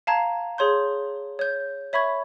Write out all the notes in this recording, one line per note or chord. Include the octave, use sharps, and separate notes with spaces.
F5 A5 A#5 G#6
G#4 C#5 C6 G6
C#5 G6
C#5 E5 B5 C#6 G#6